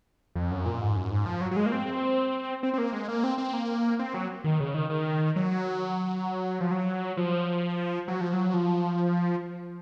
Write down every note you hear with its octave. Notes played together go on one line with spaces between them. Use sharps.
F2
F#2
A#2
G#2
F#2
G#2
F3
F#3
F#3
G#3
A#3
C4
C4
C4
A#3
G#3
A#3
C4
C4
A#3
C4
F#3
D#3
C#3
D#3
D#3
F#3
F3
F#3
F3
F#3
F3
F#3
F3